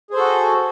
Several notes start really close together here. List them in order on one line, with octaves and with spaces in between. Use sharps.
G#4 C5 A4 F#4